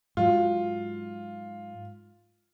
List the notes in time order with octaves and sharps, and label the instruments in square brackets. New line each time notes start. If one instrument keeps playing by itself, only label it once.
[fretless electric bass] G#2 F#3 [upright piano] F4